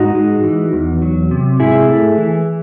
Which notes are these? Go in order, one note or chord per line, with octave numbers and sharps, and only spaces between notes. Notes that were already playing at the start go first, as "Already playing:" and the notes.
Already playing: G#2 D#4 F#4
G#3
E3
E2
F#3
C3
G#2 E4 G#4
A3
E3